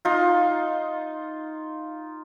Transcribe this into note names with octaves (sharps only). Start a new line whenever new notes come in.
D#4 F4